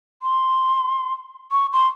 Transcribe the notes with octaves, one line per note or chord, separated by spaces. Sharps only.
C6
C#6
C6